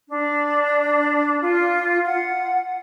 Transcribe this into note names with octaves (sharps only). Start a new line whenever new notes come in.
D4
F4
F#5